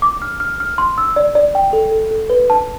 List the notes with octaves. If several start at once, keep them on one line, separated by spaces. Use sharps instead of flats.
D6
F6
F6
F6
C6
E6
D5
D5
G5
A4
A4
A4
B4
A5